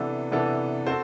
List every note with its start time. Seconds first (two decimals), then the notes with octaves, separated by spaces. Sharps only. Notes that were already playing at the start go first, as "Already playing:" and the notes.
Already playing: C3 E3 B3 D4 A4
0.31 C3 E3 B3 D4 A4
0.86 C4 F#4 A4 C5